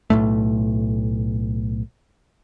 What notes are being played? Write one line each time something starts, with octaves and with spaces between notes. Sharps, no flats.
B1 A2 A3